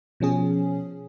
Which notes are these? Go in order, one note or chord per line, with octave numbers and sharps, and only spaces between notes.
B2 F3 C#4 G#4